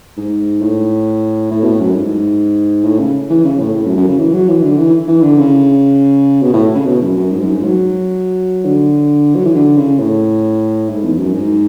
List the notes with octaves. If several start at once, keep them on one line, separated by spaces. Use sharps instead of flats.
G#2
A2
A2
B2
A2
F#2
G#2
A2
C#3
E3
C#3
A2
A2
F#2
F#2
C#3
E3
F#3
E3
D3
E3
E3
D3
C#3
B2
A2
C#3
B2
F#2
F#2
G#2
F#2
G#2
F#3
D3
F#3
E3
D3
C#3
A2
G#2
E2
F#2
G#2